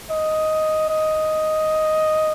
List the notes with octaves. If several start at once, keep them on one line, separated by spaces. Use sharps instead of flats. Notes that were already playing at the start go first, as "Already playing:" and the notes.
D#5
D#5